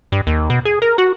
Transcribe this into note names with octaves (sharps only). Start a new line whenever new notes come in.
G2
D#2
B2
G#4
A#4
F#4